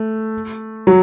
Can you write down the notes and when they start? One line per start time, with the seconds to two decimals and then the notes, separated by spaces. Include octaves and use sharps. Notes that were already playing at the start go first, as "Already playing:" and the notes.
Already playing: A3
0.87 F#3